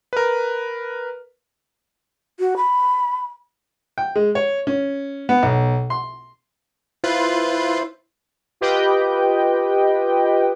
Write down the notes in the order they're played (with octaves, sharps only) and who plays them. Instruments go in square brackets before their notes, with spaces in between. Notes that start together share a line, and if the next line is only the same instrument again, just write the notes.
[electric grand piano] A#4 B4
[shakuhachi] F#4
B5
[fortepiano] G5
G#3
C#5
C#4
B3
B1
C6
[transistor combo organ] E4 C5 [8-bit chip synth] F4 B4
[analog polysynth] F4 G4 B4 D#5 G5